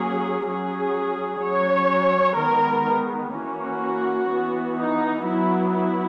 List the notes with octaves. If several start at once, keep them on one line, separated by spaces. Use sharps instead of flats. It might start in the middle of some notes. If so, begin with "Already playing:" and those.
Already playing: F#3 A#3 C#4 G#4
F#3 C#4 G#4
F#3 C#4 C#5
D#3 G#3 B3 A#4
E3 A#3 C#4 F#4
E3 B3
D#4
F#3 B3 E4
E4